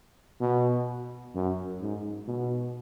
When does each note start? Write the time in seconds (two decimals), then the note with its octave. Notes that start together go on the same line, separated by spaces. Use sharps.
0.41 B2
1.35 F#2
1.81 G#2
2.28 B2